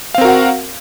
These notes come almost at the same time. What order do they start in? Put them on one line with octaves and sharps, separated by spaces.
F5 C4 A#4 F#4 F#5